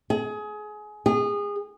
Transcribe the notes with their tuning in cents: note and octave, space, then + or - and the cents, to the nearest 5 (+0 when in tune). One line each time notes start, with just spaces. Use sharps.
G#4 +25
G#4 -25